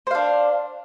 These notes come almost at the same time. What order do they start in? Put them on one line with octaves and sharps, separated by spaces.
C5 F5 D4